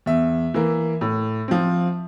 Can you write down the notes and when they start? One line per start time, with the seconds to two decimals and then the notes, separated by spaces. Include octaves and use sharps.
0.06 E2 E5
0.54 E3 A#3
1.01 A2
1.48 F3 C4